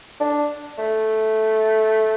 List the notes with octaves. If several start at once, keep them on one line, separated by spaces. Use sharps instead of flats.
D4
A3